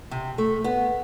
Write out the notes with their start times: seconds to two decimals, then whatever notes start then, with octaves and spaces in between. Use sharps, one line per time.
0.11 C3
0.38 A3
0.64 B3